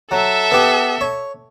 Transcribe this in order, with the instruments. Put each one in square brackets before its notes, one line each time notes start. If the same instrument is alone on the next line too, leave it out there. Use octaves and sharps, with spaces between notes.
[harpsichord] F#3 [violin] A4 E5
[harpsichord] B3 G4
C#5